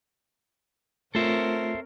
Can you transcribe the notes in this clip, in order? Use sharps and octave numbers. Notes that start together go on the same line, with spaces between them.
A3 C4 F4 A4 A#4 C5 C#5 E5